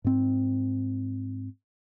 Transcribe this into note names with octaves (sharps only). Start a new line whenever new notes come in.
G#2 C4